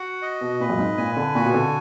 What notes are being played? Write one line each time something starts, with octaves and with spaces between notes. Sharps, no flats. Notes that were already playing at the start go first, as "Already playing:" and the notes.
Already playing: F#4 F#5
D#5
B2
A#2 B4
F#2
G#2
A#2 G#5
D3
A#2 F#4
B2
D3